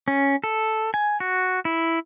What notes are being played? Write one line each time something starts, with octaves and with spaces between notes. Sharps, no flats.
C#4
A4
G#5
F#4
E4